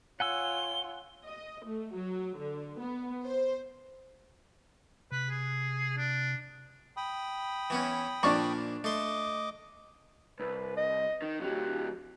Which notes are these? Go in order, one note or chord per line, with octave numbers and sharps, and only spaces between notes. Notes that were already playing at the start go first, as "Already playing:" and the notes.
F4 C#5 F#5 G#5 E6 G7
D#5
A3
F#3
D3
B3
C5
C3 B4
G#4
D4
G5 B5 D#6
E3 B3 C#4
A#2 F3 A#3 D4 D5 C#6
A3 D#5 C6 D6
C2 B4
D#5
D#3
D2 F#3 G4